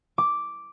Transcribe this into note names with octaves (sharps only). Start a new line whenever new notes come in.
D6